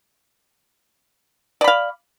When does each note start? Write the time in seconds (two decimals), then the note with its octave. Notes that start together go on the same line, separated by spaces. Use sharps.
1.61 D5
1.64 B5
1.68 F5